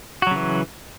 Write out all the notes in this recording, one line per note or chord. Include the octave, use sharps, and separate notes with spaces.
C#3 E3 F#3 F#4